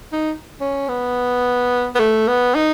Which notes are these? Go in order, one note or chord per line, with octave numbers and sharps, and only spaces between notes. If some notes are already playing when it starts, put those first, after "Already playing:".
D#4
C#4
B3
B3
A3
B3
D#4